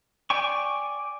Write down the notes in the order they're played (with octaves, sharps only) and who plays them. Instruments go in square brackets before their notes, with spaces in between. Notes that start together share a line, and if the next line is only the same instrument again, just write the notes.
[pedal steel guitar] D5 G5 G#5 C#6